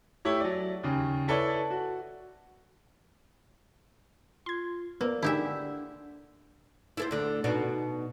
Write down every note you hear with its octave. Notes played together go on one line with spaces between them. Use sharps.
A3 E4 G4 C#5
F#3 D5
D#2 C#3
E4 A4 B4 C#5 D5
F#4
F4 C6 G#6
A#3 B3 B4 C5 D5 E6
D3 A3 D#4 E4 G4 G#4 E5
E4 A4 C5
D2 D3
B2 D4 D#4